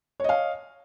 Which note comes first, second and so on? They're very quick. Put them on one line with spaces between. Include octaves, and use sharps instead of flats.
C#5 D#5 F5